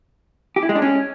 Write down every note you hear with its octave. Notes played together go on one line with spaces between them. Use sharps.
G4
E4
G#3
D4
C#4